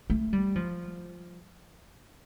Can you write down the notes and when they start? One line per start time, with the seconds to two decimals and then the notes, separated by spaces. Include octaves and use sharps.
0.10 A3
0.33 G3
0.55 F3